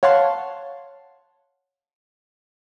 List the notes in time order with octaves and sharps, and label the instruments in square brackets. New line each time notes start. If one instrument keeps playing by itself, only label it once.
[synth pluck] C#5 F5 F#5 A5 C6